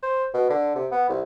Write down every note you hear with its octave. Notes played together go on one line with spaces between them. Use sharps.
C5
B2
D3
C3
B3
C2